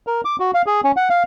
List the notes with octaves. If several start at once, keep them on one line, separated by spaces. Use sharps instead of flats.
A#4
D6
F#4
F5
G#4
C#4
F#5
F5